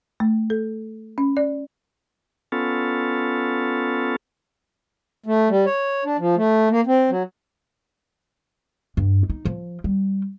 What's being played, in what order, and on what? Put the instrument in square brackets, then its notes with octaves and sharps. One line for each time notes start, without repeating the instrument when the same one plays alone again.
[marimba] A3
A4
C#4
D5
[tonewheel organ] B3 C#4 F4 A4
[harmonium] A3
G3
C#5
D4
F3
A3
A#3
C4
F#3
[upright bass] G2
D#4
F3
G3